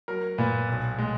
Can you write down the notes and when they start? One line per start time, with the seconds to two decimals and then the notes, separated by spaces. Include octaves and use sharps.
0.08 F#3 A#4
0.38 A#2 B4
0.68 B1
0.99 G#3